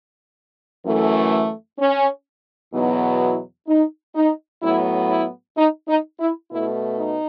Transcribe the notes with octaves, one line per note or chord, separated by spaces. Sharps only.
F#2 E3 A3
C#4
E2 B2 F#3 B3 D#4
E4
D#4
D#4
A2 F#3 B3 E4
E4
D#4
D#4
E4
B2 A3 E4
D#4